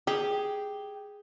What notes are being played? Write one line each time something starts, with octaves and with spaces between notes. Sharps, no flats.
G4 G#4